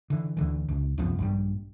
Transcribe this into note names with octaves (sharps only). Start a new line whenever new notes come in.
D3 E3
D2 D3 E3
C#2
C2 F#2 F3 B3
A#1 G2 G3